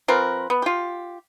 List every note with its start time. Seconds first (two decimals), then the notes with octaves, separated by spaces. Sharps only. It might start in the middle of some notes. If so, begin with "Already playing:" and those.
0.08 F3 C4 A#4 B4
0.50 B3
0.62 F4 G4